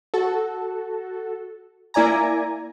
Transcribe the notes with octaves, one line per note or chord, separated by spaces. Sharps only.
F#4 A4
A#3 E4 D5 G#5 A#5